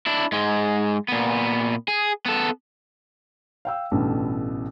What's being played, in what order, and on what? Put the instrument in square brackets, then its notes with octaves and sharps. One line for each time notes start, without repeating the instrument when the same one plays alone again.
[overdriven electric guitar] D4 E4
G#2 G#3
A#2 B3
G#4
B3 A4
[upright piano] F5 G5 E6
A1 G2 B2 E3 A3